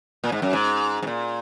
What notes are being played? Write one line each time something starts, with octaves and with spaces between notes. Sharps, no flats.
A#2
G#2
F#2
G#2
G#2
A#2